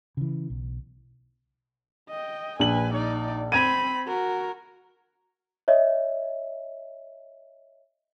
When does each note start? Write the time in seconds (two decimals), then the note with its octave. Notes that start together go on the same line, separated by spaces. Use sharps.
0.17 C#3 E3
0.50 B1
2.10 D#5 G5
2.59 A#1 B4 G#5 F#7
2.93 D#4 D5
3.52 C4 B5 G#6 D#7
4.07 F#4 A#4
5.68 C#5 D#5 E5